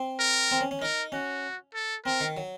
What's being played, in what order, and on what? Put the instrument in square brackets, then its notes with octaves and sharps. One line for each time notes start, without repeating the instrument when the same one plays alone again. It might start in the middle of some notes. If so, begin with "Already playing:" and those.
Already playing: [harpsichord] C4
[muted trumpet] A#4
[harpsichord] C4
C#4
C#4
[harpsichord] D#4 [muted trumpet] A#4
[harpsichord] C#4 [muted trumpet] F#4
[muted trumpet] A4
[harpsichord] C4 [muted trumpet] A#4
[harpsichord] D#3
F#3